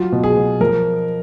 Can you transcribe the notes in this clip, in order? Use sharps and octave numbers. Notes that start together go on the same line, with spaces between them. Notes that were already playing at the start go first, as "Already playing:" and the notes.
Already playing: F#3 F4
B2
G#4
B2
F3 A#4